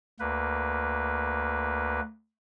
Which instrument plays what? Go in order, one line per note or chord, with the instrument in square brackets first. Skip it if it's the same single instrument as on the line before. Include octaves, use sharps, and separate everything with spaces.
[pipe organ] D2 A#3 B4